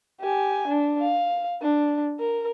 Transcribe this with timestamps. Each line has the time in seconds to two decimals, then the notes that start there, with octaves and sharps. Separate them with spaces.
0.21 G4 G#5
0.67 D4
1.01 F5
1.62 D4
2.20 A#4